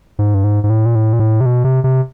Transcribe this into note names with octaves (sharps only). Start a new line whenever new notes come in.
G#2
G2
G#2
G#2
A2
A#2
A2
A#2
A2
C3
B2
C3
C3